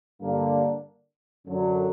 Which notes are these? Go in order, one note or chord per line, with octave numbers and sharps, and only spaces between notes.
G2 D3 A#3 D4
F#2 D3 F#3